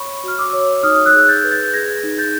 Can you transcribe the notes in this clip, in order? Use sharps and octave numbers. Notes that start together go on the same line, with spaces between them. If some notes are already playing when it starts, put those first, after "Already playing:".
Already playing: C#5 B5 C#6
F#4 F6
D6 E6
C#5
D#4 D#6 F6
E6 F#6
G#4
G6 A6
B4
G6 A6
G#4 G#6 A#6
D#4
G6 A6